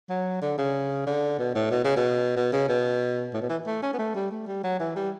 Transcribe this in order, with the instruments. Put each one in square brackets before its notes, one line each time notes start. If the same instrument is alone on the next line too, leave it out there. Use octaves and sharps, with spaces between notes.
[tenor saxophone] F#3
D3
C#3
D3
B2
A2
B2
C#3
B2
B2
C#3
B2
A2
B2
E3
A3
C#4
B3
A3
G3
A3
G3
F#3
E3
G3